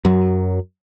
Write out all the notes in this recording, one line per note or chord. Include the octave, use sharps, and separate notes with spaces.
F#2 F#3